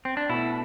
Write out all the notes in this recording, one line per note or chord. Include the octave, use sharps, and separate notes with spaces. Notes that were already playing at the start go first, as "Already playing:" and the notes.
C4
D4
B2 A3 E4